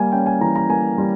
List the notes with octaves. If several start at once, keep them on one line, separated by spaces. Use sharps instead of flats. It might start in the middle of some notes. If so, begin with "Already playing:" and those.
Already playing: G3 A#3 G#5
C#4 G5
G#5
E3 A#5
A#5
A#3 G#5
G3